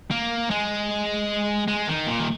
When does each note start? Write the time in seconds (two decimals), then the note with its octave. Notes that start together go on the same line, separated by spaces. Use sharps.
0.11 A#3
0.50 G#3
1.67 G#3
1.88 D#3
2.06 A#2
2.20 D#3